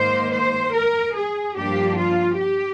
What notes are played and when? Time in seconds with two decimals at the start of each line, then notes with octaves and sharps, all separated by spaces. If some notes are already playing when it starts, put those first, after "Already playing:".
Already playing: G#2 D#3 A#3 C5
0.32 C5
0.73 A#4
1.15 G#4
1.56 G2 F3 A#3 D4 G4
1.98 F4
2.39 G4